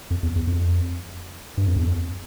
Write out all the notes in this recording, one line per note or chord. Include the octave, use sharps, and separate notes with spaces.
F2
E2
E2
F2
G2
F2
E2
F2